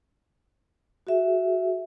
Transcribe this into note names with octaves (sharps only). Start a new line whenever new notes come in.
F#4 G#4 E5